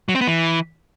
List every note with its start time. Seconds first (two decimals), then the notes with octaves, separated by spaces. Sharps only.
0.09 F#3
0.15 C4
0.21 B3
0.27 E3